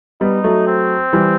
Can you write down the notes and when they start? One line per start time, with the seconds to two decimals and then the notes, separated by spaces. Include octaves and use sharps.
0.21 G3 B3 D#4
0.44 F#3 A3
0.67 C4
1.13 E3 G3